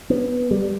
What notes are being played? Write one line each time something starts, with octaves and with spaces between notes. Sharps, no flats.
B3
G3